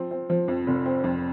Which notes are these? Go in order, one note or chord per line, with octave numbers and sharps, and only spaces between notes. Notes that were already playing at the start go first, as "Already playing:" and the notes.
Already playing: F3 C4
C4
F3
F2
F1
C4
F2